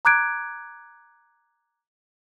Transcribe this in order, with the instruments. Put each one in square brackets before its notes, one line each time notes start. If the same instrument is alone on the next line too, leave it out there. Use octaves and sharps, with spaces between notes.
[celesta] A#5 D6 F#6 G#6 D7